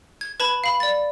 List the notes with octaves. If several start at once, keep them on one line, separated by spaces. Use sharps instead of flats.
G#6
B4 A5 B5 G#6
F5 B5
D5 A6